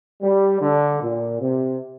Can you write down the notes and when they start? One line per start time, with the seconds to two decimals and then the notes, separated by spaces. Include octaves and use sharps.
0.22 G3
0.61 D3
1.01 A#2
1.40 C3